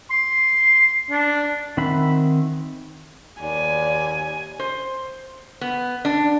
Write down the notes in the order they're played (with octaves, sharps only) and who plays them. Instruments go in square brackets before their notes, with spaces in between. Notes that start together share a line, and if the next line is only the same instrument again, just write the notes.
[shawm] C6
D4
[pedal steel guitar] D#3 C4 E5 F#5 B5
[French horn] D#2 [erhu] D5 [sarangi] G#5
[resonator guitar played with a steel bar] C5
B3
D4